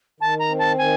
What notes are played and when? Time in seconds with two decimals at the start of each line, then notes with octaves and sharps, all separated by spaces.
0.20 D#3 A5
0.39 A#5
0.49 C4
0.59 A5
0.78 D#3 G#5